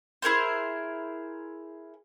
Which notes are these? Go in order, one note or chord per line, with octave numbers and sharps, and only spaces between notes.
E4 G#4 A#4 C5